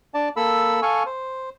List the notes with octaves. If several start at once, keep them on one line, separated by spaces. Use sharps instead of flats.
D4 D5 A5
A#3 A4 B5 E6
A4 F5 G#5 C#6
C5